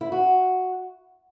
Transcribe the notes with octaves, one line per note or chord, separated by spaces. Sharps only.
E4
F#4